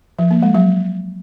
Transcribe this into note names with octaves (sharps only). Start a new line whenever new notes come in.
F3
A#3
G#3
F#3